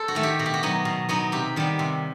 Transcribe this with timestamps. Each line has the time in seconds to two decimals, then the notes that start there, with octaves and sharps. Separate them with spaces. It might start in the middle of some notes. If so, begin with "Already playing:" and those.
Already playing: A4 C5
0.08 F#4
0.15 D#3 A3
0.23 G4
0.39 B2 F#4
0.46 G4
0.54 F#4
0.63 F#3 B3 D#4
0.85 B2
1.09 F#3 B3 D#4
1.32 C3 G4
1.56 D#3 G3 B3
1.79 C3